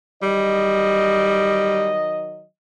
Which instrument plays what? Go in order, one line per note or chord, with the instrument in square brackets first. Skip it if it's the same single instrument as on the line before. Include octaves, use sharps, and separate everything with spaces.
[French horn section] D#3 F#3 D#5 [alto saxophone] G3